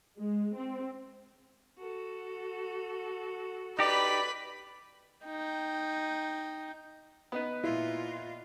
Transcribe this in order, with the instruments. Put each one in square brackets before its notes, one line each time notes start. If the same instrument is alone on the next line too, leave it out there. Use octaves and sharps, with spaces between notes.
[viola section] G#3
C4
[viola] F#4 A4
[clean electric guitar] D#4 G4 [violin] B4 B5 [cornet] D5
[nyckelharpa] D#4 G5
[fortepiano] B3 D#4 B4
[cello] A#2 F4 [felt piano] E4